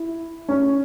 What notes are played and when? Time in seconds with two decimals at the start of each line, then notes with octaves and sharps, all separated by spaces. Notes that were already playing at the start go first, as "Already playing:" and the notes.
Already playing: E4
0.49 C#4